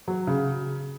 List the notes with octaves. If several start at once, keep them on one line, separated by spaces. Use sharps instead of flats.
F#3
C#3